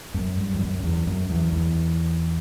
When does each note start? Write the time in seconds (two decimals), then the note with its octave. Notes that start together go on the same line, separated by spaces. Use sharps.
0.14 F#2
0.37 G2
0.54 E2
0.60 F#2
0.83 E2
1.07 F#2
1.30 E2
1.53 E2